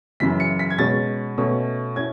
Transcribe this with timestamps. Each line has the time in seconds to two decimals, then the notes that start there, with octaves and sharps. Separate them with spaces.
0.20 F#2 C#3 E3 B6
0.40 C#7
0.59 B6
0.70 G#6
0.78 B2 G#3 C#4 A6
1.38 B2 A3 C#4
1.96 C#4 E4 G#6